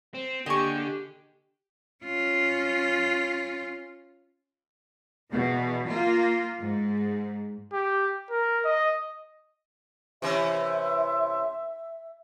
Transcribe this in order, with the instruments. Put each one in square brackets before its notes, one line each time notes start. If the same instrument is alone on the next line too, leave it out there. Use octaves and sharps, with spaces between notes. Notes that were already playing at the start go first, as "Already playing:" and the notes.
[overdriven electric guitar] C4
[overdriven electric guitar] D3 [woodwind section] A#3 G5 G#5 [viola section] G4 [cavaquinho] D#5 C#6
[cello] C#4 F4
[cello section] E2 B2
A#3 F4
G#2
[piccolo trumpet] G4
A#4
D#5
[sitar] C3 E3 C#4 [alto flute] E5